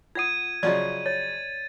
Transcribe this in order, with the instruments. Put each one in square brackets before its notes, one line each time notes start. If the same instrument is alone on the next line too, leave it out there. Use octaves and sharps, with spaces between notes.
[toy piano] F4 F#5 D#6 [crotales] G#6 D#7
[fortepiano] C#3 F3 F#3 [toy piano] D5 D#5
[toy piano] C#5 [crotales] A6